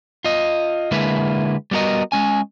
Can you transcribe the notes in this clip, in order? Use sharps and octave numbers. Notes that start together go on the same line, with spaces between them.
F4 D#5
D3 G#3 A#3 E4 B4
G3 B3 F#4 A#4 D#5
G#3 C#4 G#5